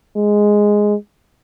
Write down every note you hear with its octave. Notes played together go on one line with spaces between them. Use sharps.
G#3